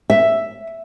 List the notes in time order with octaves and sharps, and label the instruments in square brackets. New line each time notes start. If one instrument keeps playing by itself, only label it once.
[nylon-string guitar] E5